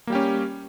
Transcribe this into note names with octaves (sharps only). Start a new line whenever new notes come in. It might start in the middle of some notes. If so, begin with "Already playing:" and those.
G3 A#3 C#4 G4